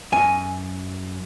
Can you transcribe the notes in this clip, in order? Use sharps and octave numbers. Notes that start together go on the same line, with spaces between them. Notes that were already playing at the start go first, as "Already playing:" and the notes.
F#2 G#5